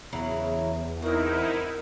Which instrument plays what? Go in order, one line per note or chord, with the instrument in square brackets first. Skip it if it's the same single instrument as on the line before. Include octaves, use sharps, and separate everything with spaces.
[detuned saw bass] E2 [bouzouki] C#3 F#3 E4
[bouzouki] C4 F#4 [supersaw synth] D#4 E4 [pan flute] A#4